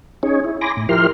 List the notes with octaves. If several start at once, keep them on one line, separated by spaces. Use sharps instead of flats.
C#4 D#4 G#4 C#5
E4
G#5 B5 C6 D6 A#6
A2
F3 E4 G4 A#4 C6 F6